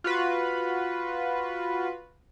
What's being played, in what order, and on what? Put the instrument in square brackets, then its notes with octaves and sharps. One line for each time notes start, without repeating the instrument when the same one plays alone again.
[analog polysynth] F4 F#4 B4